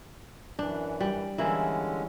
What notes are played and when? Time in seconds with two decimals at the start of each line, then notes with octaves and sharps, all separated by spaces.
0.59 F#2 E3 D4
1.00 G3
1.38 D3 E3 G#3 A#3 C#4 E4